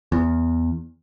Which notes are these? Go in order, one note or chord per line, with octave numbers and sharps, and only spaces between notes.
E2